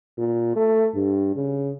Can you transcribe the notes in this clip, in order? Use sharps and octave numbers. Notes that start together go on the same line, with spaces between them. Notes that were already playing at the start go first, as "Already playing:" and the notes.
A#2
A3
G2
C#3